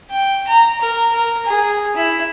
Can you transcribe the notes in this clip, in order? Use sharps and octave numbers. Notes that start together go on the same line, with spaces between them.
G5
A#5
A#4
A#4
G#4
E4